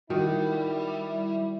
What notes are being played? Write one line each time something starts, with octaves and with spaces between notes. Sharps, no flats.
D#3 G3 E4 F#4